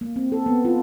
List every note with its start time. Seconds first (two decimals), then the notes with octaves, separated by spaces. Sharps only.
0.01 A#3
0.16 C4
0.32 A4
0.46 B3
0.65 F4